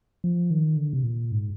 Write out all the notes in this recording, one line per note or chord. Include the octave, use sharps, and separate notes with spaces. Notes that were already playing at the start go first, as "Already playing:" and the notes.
F3
D#3
D3
C3
A#2
G#2